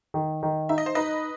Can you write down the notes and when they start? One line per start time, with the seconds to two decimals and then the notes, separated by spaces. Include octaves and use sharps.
0.14 D#3
0.43 D#3
0.69 D#4 E5
0.78 D#5
0.86 C5
0.95 D#4 B4 D#5